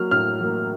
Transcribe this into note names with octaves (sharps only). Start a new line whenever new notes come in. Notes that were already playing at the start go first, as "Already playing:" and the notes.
Already playing: F#3 A#3 F6
A2 F6
F#3 A#3